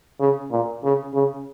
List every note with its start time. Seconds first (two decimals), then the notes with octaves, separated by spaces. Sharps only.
0.20 C#3
0.51 A#2
0.83 C#3
1.14 C#3